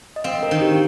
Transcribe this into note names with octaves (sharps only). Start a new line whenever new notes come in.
D#5
C4 F5
A#4
D#3
G4